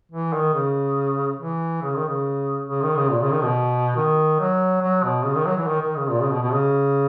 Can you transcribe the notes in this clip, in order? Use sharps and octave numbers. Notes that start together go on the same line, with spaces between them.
E3
D#3
C#3
E3
C#3
D#3
C#3
C#3
D#3
C#3
A#2
C#3
D#3
B2
D#3
F#3
F#3
B2
C#3
D#3
F#3
E3
D#3
D#3
C#3
A#2
C#3
B2
B2
C#3